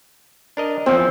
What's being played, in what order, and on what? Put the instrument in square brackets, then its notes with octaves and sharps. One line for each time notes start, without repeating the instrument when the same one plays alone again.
[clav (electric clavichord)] D4 A#4 D#5
[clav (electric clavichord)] E2 F3 [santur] C4